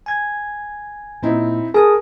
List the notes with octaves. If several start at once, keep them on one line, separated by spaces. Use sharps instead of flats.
G#5 G#6
A#2 C4 D#4 E4
G#4 A#4 A5 D#6